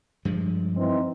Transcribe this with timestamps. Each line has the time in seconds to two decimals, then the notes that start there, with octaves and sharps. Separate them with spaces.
0.25 G2 F3 G#3
0.76 E3 C4 D#4